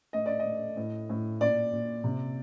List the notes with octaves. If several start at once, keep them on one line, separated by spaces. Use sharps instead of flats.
A3 D#5
D5
D#5
A3
A2
A2
A#2 D5
A#2
C3